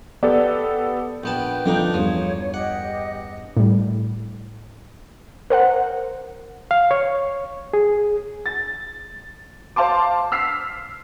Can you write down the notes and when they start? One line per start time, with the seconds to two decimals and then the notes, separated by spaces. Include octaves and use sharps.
0.23 B3 G4 A4 D5
1.23 A#1 B3 B4 G5 A5 G6
1.66 D3 F3 B3 D4 D#4
1.94 E2 G2 F3 C#5
2.54 G4 D#5 F#5
3.57 A2 G3
5.50 A#4 C5 F#5
6.71 F5
6.91 C#5
7.73 G#4
8.46 A6
9.76 C5 F5 A5 C6 D6
10.32 E6 F6 B6 C7